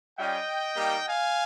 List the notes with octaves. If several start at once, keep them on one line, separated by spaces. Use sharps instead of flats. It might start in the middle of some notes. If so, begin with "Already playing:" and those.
G3 C#4 F4 D#5 G5
G3 A#3 D#4 G4
F5 G#5